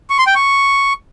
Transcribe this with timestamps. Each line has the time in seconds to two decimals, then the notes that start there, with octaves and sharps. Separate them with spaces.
0.10 C#6
0.18 C6
0.27 G5
0.35 C#6